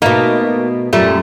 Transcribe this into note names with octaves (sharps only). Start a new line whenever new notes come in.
B2 A3 A#3 D#4
F#2 A#2 G3 A3